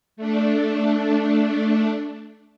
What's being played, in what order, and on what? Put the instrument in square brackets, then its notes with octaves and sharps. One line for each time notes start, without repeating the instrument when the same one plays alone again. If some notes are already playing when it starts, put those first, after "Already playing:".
[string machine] A3 D4